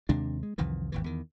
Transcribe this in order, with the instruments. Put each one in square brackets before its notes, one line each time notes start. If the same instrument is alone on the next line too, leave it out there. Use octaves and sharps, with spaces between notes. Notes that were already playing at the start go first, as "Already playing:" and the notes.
[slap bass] D#2 C3 G#3 D4
G#3
C2 F2 D#3 E3
G#1 D#2 E3
E2 D#3